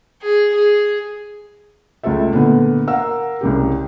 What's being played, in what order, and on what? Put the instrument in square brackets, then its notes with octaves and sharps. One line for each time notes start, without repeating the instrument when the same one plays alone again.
[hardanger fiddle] G#4
G#4
[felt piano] C#2 A3 F4 A4 E5
A#2 D3 A3 B3
A#4 F5 F#5 E6
C2 C#3 G4